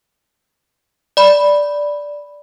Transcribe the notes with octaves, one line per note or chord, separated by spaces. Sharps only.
D5 B5